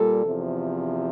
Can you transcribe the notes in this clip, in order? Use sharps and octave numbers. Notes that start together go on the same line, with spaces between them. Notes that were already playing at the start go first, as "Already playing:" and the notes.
Already playing: A#2 G3 A4
E2 C3 F3